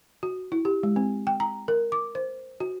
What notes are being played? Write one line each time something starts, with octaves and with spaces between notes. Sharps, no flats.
F#4
E4
G4
G#3
C4
G5
A#5
A#4
D6
C5
F#4